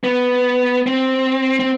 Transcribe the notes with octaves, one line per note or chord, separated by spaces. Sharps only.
B3
C4
C4